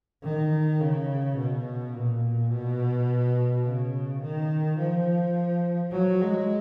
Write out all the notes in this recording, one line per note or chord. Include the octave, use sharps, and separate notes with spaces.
D#3
C#3
B2
A#2
B2
C#3
D#3
F3
F#3
G#3